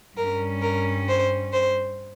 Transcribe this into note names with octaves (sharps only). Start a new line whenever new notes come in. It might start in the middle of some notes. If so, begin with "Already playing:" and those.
G2 G3 C#4 A#4
A#4
C5
C5